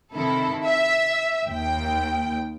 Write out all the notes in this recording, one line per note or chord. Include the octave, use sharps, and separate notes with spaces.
C3 D#3 E4 A4
E5
D#2 G5